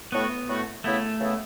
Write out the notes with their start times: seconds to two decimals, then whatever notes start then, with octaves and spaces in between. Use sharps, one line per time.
0.12 A2 A3 B3 F#4
0.48 A2 A3 F#4
0.84 C#3 E3 A3 B3 E4
1.19 C#3 E3 B3 E4